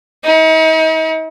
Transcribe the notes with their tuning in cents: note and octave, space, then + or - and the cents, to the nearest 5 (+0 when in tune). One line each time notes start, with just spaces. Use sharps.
D#4 +45